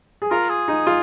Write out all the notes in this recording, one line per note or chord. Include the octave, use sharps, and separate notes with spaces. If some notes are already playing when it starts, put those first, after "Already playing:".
G#4
F4 A#4
G#4
D#4
F4